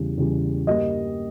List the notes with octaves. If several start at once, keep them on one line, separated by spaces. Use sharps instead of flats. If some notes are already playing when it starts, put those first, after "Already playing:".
Already playing: E2 C#3 G3
E2 C#3 G3
G2 G3 A#3 D#5